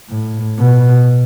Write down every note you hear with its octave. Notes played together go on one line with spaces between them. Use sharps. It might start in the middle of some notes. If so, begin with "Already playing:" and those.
A2
B2